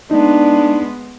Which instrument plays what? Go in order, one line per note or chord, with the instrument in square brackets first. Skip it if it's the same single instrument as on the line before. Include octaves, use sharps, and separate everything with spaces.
[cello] G#3 B3 [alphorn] D4 [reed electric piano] D#4